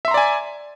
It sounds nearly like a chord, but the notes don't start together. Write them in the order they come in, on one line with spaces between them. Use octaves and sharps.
E5 C6 A#5 D5 G#5